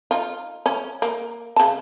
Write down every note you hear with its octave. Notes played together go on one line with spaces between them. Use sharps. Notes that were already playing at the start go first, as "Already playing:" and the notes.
D#4 F4
C#4
A#3
C#3 A5